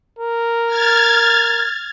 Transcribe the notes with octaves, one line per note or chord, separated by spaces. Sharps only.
A#4
F6 G#6 A6